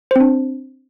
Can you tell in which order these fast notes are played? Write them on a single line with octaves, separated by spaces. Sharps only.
C5 C4 D4